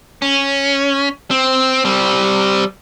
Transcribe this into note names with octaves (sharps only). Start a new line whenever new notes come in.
C#4
C4
G3 C4